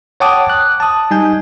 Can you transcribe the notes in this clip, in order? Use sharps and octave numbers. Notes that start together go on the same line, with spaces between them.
C#5 F#5 G5 A5 D6 D#6
F#6
A5 D#6
G3 D#4 G#5 G6